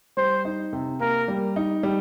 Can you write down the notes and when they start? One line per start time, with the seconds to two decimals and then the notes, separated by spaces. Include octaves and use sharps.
0.17 G3 C5
0.45 D#4
0.73 C3
1.00 A#3 A#4
1.28 G3
1.56 D#4
1.83 G3